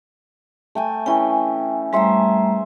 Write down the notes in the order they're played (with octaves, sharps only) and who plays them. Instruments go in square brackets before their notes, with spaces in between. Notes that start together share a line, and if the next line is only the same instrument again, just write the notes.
[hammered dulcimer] A3 G5 G#5
[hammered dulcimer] E3 C#4 [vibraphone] G5
[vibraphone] G3 A3 A#5 [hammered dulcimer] G#4 C5 E5